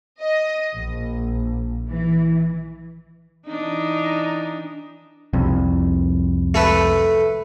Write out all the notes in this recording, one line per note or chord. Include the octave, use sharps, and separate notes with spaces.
D#5
A#1
E3
E3 D4 D#4
C2 F2
A3 A4 B4